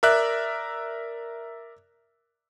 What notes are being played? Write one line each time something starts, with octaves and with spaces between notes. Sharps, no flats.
A#4 D5 E5 F#6